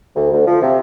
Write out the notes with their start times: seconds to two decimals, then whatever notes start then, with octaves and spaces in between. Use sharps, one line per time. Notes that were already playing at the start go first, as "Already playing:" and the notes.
0.16 D2
0.31 D2
0.46 F3
0.61 C3